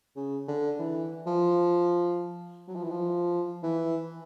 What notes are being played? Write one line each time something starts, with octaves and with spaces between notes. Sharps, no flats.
C#3
D3
E3
F3
F#3
F3
E3
F3
E3